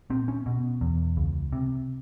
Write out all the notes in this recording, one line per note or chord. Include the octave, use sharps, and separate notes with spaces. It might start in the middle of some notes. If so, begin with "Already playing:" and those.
A#2 C4
C#4
B2
E2
C#2
C3